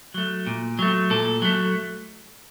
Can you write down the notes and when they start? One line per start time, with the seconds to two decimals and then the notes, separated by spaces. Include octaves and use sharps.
0.14 F#3 A3
0.47 A#2
0.79 F#3 A3
1.10 A#2 A4
1.42 F#3 A3